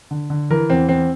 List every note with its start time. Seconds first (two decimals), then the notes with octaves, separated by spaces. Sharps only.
0.11 D3
0.30 D3
0.50 E3 A#4
0.70 E2 C4
0.89 E2 C4